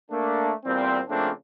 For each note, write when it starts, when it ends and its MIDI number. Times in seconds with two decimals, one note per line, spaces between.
0.11 0.52 57
0.11 0.52 58
0.11 0.52 62
0.65 1.00 40
0.65 1.00 46
0.65 1.00 55
0.65 1.00 60
1.09 1.30 49
1.09 1.30 53
1.09 1.30 57
1.09 1.30 58
1.09 1.30 60
1.09 1.30 62